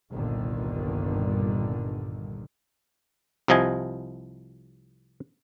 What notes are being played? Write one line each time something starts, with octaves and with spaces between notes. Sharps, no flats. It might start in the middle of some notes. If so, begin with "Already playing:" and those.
G1 C2 G2 A#2 D3 D#3
C2 C3 F3 D#5 G#5